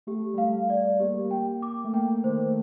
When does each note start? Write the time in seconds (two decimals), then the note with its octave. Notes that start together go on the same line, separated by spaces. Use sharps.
0.07 A3 G4
0.34 G3
0.38 A3 F5
0.69 A3 D5
1.00 A#3 G4
1.25 A#3
1.31 G5
1.62 D6
1.84 A3
1.93 A#3 G5
2.24 D#3 C5
2.47 A3